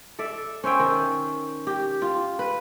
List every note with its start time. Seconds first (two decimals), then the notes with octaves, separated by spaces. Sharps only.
0.19 A4 D5 E5
0.64 C#4 C5 E5 G5
0.80 D#3
1.67 G4
2.02 F4
2.39 B4